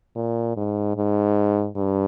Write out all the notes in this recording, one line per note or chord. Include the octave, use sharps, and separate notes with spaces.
A#2
G#2
G#2
G2